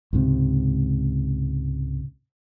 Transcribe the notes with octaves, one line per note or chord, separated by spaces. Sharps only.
C#2 G#2 C3